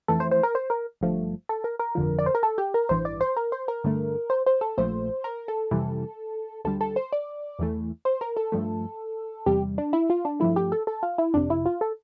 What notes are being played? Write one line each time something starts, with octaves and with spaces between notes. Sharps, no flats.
F2 E3 A3 A4
C5
C5
A#4
C5
A#4
G1 G2 F3 A3
A4
A#4
A#4
G1 F2 D3 F3
D5
C5
A#4
A4
G4
A#4
A1 G2 E3 C5
D5
C5
A#4
C5
A#4
G2 D3 A3
C5
C5
A4
A#1 A#2 F3 A3 C5
A#4
A4
F2 C3 E3 G3
D2 D3 G3 A4
A4
C5
D5
E2 E3 A3
C5
A#4
A4
G2 F3 A3
E2 C3 G3 G4
D4
E4
F4
D4
G2 F3 A3 E4
G4
A4
A4
F4
E4
G1 F2 C3 D4
E4
F4
A4